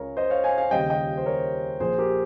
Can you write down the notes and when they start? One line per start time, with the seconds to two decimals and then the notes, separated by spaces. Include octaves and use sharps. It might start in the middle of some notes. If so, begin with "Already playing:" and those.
Already playing: C#2 C#3 G#3 A#4 C#5
0.17 C5 D#5
0.30 C#5 F5
0.44 F5 G#5
0.58 F5 G#5
0.71 D#2 C#3 G3 D#5 G5
0.90 D#5 G5
1.18 C5
1.26 A#4 C#5
1.80 A#1 A#2 F3 G#4 C5
1.98 G4 A#4